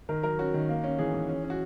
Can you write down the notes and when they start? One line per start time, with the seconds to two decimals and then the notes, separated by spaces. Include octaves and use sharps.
0.09 D#3 A#4
0.23 F#3 A#4
0.39 C#4 F#4
0.54 D#3
0.69 A#3
0.84 C#4
0.99 E3 G#4
1.14 E3
1.29 C#4
1.44 C#4
1.50 F#4